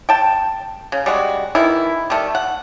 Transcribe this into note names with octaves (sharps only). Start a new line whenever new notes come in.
G5 A5
C#3
G3 G#3 F#4
D#3 E3 G#3 E4
D#3 G3 A3
F#5